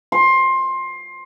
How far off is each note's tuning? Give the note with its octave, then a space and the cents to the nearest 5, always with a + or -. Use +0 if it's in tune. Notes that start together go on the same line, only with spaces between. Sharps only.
C6 +20